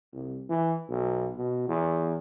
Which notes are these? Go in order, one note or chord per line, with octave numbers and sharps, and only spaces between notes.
C2
E3
B1
B2
E2